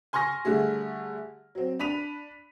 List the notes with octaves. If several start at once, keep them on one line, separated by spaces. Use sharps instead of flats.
G#5 C6 C#6 F6 A#6
D3 G3 A3 G#4
F#3 C4
D4 B5 B6 D#7 F7